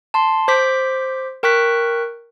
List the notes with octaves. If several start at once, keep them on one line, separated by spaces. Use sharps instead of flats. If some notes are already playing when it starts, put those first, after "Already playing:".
A5 C6
C5 D6 G6 B6
A#4 G5 C#6 F#6 B6